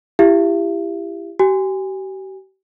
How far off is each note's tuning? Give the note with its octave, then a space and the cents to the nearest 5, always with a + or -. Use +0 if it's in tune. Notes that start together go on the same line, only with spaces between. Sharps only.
E4 +25 G4 +15 E5 +45
G4 -40 G#5 -25